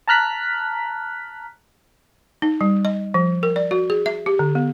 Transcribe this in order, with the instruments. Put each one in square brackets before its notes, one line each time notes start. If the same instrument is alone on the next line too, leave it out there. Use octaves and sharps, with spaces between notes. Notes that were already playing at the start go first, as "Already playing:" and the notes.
[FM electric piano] A5 A#5 F6 F#6 B6
[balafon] D#4
G3
D#5
F3
A#4
D5
F#4
G#4
E5
G4
D3
B3